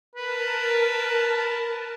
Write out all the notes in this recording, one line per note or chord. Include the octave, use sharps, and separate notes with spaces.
A#4 B4 A5